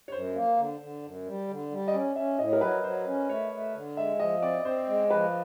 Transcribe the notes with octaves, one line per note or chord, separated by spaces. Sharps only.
C#5
F#2 C5
A#3
D3
D3
F#2
G3
D3
G3
D#5
C#4 D5
C#4 E5
A2 D#5
A#4
F#3 B4
F#3 C5
C#4
A3 C#5
A3
D3
G#3 E5
F3 D#5
C4 D5
C4 C5
G#3
F3 B4